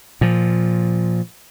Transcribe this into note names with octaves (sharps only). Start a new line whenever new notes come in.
A#2 F3